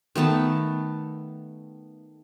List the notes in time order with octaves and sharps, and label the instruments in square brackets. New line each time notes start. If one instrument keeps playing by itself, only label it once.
[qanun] D#3 A3 B3 A5